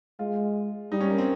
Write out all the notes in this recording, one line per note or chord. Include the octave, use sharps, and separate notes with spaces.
G#3 F4
G3 D#4
C#4
A#3
C4